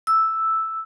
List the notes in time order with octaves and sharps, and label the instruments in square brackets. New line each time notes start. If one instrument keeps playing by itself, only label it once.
[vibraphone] E6